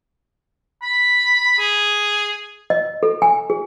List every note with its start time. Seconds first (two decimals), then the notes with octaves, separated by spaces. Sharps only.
0.82 B5
1.59 G#4
2.70 D#5
3.03 A4
3.22 G#5
3.50 G#4